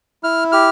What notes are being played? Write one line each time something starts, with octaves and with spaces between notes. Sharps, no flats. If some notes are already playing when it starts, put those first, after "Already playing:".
E4 F6
G4 F6